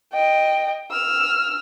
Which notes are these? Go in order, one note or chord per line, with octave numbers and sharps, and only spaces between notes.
D#5 G5
E6 F6